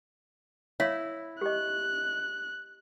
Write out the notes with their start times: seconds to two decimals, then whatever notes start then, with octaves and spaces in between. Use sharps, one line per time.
0.80 E4 C#5 E5 F5
1.41 G4 D#5 F#6